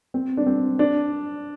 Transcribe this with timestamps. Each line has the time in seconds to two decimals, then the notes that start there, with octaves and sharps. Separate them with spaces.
0.14 C4
0.37 D4
0.47 C4
0.79 D4